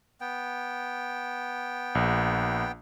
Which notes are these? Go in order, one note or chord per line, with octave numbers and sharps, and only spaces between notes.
B3 G5
A#1